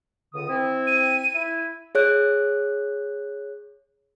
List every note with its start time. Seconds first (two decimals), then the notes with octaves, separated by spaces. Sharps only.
0.34 C#2 D3 D#6
0.49 C4 E4
0.87 D#7
1.34 E4
1.95 G#4 C#5 F#6